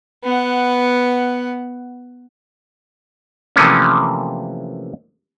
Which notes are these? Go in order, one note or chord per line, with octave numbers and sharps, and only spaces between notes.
B3 F#5
C3 E3 F3 A3 A#3 C#4